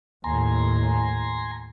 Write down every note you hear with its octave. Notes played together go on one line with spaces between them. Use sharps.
D#2 A2 G#5 A#5 C6